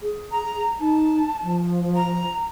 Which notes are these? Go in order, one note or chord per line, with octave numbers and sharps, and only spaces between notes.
G#4
A#5
D#4 A5
F3
A#5